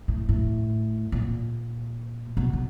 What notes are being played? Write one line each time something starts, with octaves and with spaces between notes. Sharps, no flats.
A2
A2
A#2
B2
B2